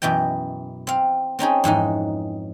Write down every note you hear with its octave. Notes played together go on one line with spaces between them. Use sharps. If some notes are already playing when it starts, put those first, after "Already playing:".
F#2 B2 E3 D#5 G5
C4 F5
C4 C#4 D#4 G#4
F2 G#2 E3 D#4